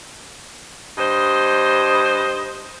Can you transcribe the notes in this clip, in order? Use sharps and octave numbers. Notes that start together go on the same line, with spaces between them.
G2 C5 D#5